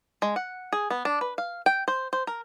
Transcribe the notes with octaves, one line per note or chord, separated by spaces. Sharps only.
G#3
F#5
G#4
B3
D4
B4
F5
G5
C5
C5
A#4